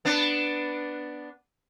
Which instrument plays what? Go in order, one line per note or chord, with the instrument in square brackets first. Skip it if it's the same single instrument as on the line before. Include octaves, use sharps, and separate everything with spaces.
[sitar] B3 D4